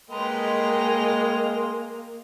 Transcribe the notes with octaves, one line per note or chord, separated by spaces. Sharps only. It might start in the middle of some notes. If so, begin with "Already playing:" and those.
G#3 A#3 B4 D#5 G5 A#5 C6